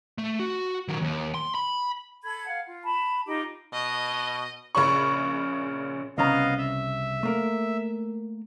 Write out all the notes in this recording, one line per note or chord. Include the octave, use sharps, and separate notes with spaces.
A3
F#4
D#3 F#3
D#2
C6
B5
A4 B5 G#6
F5 F#5
F4
A5 B5
D#4 F4 G4 D#5
B2 D#5
A#1 C#3 C#4 B5 C#6
C2 C#3 B3 D#5 F5 A#5
E5
A3 A#3 A#4